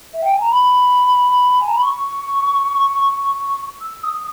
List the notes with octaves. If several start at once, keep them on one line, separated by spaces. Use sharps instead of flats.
E5
G5
G#5
A#5
B5
G#5
A#5
B5
C#6
E6
D#6